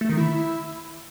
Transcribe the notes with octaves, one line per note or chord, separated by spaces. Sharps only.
A3
D#3
E4